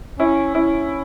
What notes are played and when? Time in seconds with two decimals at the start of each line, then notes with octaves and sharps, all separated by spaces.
0.19 C#4 E4
0.55 C#4 E4